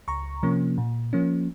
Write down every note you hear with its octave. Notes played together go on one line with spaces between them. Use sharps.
C#2 A#5 C#6
C3 F3 A#3 C#4
A#2
F3 A#3 C#4